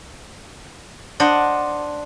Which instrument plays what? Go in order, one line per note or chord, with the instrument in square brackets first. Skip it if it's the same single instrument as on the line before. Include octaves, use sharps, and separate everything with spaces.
[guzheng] D4 C5 D#5 F#5